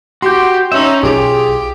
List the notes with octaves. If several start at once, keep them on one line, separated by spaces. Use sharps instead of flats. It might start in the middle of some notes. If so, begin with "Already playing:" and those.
F#4 G4 C6 G6
C#4 D#4 E5 A#5
B1 F4 G4 G#4